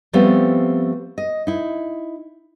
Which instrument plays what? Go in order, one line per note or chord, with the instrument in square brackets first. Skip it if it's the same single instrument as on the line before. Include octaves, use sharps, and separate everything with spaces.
[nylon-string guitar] F3 G3 A3 B3 C4
D#5
D#4 E4